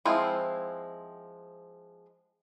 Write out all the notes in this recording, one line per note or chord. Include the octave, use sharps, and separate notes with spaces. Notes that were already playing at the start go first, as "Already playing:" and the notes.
F3 G#3 C4 E4